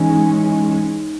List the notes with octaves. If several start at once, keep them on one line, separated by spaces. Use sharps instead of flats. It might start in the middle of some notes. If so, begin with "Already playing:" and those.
Already playing: E3 G#3 C#4 D#4